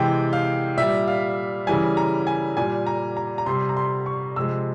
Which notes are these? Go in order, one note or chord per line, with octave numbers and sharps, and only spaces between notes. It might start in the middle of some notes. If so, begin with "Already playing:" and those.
Already playing: C3 E3 G#3 G5
F5
A#2 G3 E5
F5
C#3 E3 G3 G#5
A#5
G#5
A#2 G3 G#5
A#5
A#5
A#5
C3 G3 C6
A#5
C6
C#6
C3 F3 G#3 E6